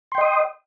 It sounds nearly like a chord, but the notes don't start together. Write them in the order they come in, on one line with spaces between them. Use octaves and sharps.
C6 G5 D#5 D#6